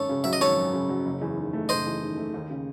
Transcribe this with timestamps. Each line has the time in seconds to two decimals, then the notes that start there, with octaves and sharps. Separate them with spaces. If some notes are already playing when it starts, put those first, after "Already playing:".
Already playing: G#1 F#2 A4 C#5
0.09 C#3
0.24 F#3 E5
0.33 D#5
0.41 G#1 A4 C#5
0.57 F#2
0.73 C#3
0.89 F#3
1.05 F#1
1.21 E2
1.37 D#3
1.53 A3
1.69 F#1 C5 D#5
1.85 E2
2.02 D#3
2.17 A3
2.34 D#2
2.50 C#3